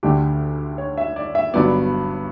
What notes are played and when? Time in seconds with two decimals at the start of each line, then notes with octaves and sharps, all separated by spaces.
0.03 D2 D3 A3 D4 G4
0.78 C#5
0.98 E5
1.16 D5
1.35 E5
1.54 G1 G2 F#3 B3 D5